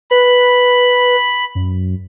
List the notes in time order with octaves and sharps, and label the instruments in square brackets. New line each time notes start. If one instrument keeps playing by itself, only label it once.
[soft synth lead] B4 [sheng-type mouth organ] B5
[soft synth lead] F#2